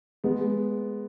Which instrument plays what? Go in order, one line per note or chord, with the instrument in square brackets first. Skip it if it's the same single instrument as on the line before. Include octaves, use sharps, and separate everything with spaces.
[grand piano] G#3 B3